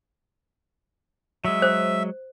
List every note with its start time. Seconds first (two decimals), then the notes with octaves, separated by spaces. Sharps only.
1.45 F#3 G#3 E5
1.62 C5